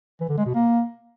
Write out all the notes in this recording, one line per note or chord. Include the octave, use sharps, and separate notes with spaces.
E3
D3
G#3
B2
A#3